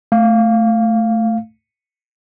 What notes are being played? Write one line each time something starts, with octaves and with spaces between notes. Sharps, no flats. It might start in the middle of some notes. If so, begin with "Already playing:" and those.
A3 F5